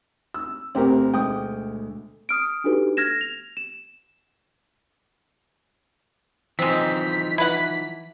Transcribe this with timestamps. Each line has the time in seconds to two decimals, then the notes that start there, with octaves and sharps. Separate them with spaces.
0.34 E6
0.75 D2 B2 C4 G4 A#4
1.14 G#3 G5 D#6
2.29 D#6 F6 D7
2.64 D4 D#4 F#4 G4 A4 B4
2.97 F6 G#6 A#6 E7
3.21 F7
3.57 E7
6.59 E3 F3 G#3 C4 D#4 B6
7.38 E4 B4 F#5